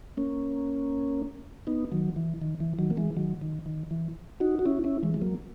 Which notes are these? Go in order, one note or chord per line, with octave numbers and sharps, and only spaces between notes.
A#3 C#4
B3 D#4
D#3 F#3
E3
D#3
E3
D#3 F#3
A#3
E3 G#3
D#3 F#3
D#3
D#3
E3
D#4 F#4
F#4
C#4 E4
C#4 E4
E3 G#3
G#3
F#3 A#3